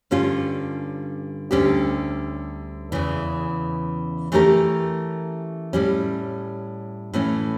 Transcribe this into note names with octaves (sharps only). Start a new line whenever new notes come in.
G2 D3 G3 C#4 F4
D2 D3 G3 C#4 G4
E2 C#3 E3
E3 A3 C#4 G4 A#4
A2 G3 C#4
A2 E3 A3 C#4